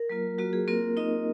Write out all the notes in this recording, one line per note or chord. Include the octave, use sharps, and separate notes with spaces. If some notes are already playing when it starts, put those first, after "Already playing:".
Already playing: A#4
F#3 A#3 F4
F#3 A#3 F4 F#4
G#4
A#3 C4 F4 A#4
C4 D#4 F4 D#5